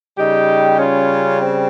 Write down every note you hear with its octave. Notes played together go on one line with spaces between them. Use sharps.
C#3 G3 D#4 G4
C#4 F4
C4